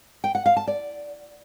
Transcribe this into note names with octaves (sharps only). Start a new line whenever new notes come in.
G5
F#5
F5
A5
D5